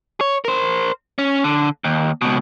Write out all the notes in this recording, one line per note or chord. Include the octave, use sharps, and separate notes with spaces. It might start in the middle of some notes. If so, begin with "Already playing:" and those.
C#5
A#4 C5
C#4
D3
D#2
C#2 B2